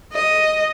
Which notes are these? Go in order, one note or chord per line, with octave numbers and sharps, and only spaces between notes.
D#5